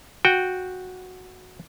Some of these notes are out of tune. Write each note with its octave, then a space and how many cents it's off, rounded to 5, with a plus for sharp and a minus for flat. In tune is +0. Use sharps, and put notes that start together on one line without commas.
F#4 -10 G5 +0